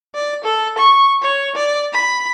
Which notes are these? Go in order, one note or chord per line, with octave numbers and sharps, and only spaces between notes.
D5
A4
C#6
C#5
D5
B5